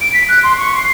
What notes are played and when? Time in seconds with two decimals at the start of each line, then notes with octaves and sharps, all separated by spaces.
0.01 D7
0.13 B6
0.29 F#6
0.43 C6
0.58 C#6
0.76 C7